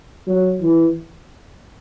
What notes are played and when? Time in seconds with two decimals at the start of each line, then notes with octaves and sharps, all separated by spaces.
0.27 F#3
0.61 E3